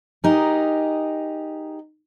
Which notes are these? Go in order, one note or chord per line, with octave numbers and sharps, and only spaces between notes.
D#4 G4 G#4 A#4